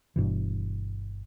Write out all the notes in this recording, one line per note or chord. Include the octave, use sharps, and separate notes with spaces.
G1 G2 B2 E3